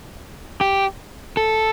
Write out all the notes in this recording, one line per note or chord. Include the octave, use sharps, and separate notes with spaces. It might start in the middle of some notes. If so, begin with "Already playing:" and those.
G4
A4